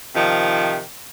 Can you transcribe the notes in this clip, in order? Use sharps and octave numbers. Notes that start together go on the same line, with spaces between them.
C3 D#3 F3